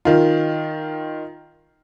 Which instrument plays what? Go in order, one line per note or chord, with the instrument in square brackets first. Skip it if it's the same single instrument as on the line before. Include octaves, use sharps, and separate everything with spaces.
[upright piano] D#3 F4